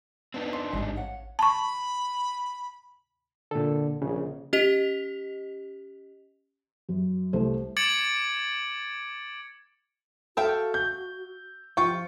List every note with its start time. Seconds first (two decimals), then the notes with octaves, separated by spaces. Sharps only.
0.34 B3 C4 D4 D#4
0.53 C6
0.73 A1 G#2 G3
0.96 C#5 F5 F#5
1.39 A5 B5 C#6
3.51 A#2 D3 A4
4.02 A#1 C#3
4.53 C#4 G4 D#5 F7
6.89 F#2
7.33 C2 A3 C5
7.77 D6 G#6 A6 C#7 D7 F#7
10.37 F#4 A4 E5 F5 G5
10.74 G6
11.77 F3 F4 G5 C#6